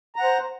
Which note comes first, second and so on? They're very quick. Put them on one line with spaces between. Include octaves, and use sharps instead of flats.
A#5 F#5 C5